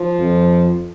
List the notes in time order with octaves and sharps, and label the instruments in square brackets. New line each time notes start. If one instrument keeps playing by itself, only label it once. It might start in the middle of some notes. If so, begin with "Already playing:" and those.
Already playing: [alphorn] F3
[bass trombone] F2